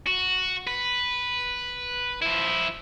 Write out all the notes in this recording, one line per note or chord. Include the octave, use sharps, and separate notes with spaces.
F#4
B4
F3 E4